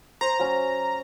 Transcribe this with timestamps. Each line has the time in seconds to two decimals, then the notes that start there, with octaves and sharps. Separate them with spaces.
0.21 C5 A#5
0.39 F#3 C#4